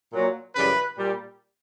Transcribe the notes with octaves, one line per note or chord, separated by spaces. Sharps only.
A#2 F#3
F#2 C#3 E3 G3 B4
A#2 G3